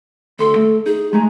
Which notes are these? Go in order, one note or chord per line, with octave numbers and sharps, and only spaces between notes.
D2 A4 C6
A3
D#4 G#4
G#3 A3 G#4 A#5